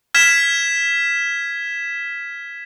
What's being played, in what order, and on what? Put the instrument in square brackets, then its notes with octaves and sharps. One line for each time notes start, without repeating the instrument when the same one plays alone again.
[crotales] F6 G#6 B6 E7